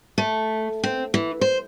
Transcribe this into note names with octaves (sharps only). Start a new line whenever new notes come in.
A3
C4
E3
C5